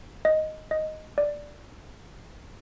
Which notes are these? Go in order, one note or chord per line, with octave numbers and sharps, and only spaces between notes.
D#5
D#5
D5